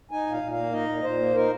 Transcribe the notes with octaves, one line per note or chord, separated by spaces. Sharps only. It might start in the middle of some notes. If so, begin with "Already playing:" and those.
D#4 G#5
A#2 F5
A#2
F5
A#3
D#4 D#5
A#2
A#2 C5
A#3
D#4 A#4